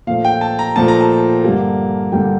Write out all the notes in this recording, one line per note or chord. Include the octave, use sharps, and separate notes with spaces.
A#2 F3 A3 F5
G5
A5
A#5
A#2 F3 A3 A5
A#5
A5
G2 D3 G3 A#3
G2 D3 G3 A#3 G5